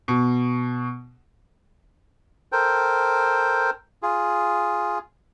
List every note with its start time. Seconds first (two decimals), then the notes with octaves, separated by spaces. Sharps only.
0.08 B2
2.52 A4 A#4 C5 G5
4.03 F4 G#4